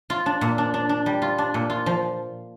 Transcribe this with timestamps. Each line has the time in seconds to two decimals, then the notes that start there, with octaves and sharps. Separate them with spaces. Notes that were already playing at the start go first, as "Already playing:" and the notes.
0.10 F4
0.26 D4
0.41 A#2
0.58 D4
0.74 D4
0.89 D4
1.06 G3
1.22 F4
1.38 D4
1.54 A#2
1.70 F4
1.86 F3